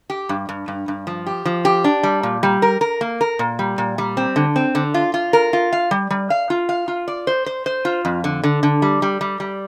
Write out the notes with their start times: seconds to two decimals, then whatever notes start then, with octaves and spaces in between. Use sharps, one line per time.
0.10 G4
0.29 G2
0.49 G2
0.68 G2
0.88 G2
1.07 F3
1.26 G4
1.46 F3
1.65 G4
1.84 D4
2.03 G3
2.23 A#2
2.43 G3
2.62 A#4
2.81 A#4
3.01 A#3
3.21 A#4
3.39 A#2
3.59 G3
3.78 A#2
3.98 G3
4.17 C4
4.36 D3
4.56 C4
4.75 D3
4.94 F4
5.14 F4
5.33 A#4
5.53 F4
5.73 F5
5.91 G3
6.10 G3
6.30 F5
6.50 F4
6.69 F5
6.88 F4
7.08 D5
7.27 C5
7.46 C5
7.66 C5
7.85 F4
8.05 F2
8.24 D3
8.44 D3
8.63 D3
8.82 G3
9.02 G3
9.21 G3
9.40 G3